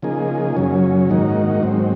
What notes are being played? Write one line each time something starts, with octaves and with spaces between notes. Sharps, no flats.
C#3 F3 A#3 D#4 G#4
F#2 C#3 F#3 C#4
G#2 D#3 A#3 D#4 F#4
G#2 F#3 C4